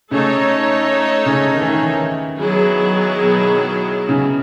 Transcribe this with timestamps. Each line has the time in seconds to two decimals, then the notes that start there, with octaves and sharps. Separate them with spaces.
0.11 C#3 A3 D#4 A4 C#5
1.26 C#3
1.53 D#3
1.61 E3
1.68 D#3
1.82 E3
2.38 D#3 F#3 B3 E4 G#4
3.23 B2
4.09 C#3